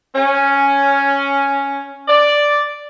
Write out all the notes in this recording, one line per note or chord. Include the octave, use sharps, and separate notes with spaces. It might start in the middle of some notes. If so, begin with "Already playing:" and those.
C#4
D5